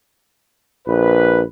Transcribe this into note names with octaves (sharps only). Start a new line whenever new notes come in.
A#1 B4